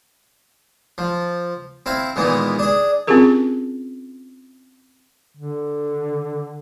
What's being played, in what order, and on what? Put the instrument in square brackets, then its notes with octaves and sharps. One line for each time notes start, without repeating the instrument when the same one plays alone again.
[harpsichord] F3
C4 E4 F5
A#2 D#3 E3 G#3 B3
D4 G#4
[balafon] C4 C#4 F4 G4 G#4 A#4
[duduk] D3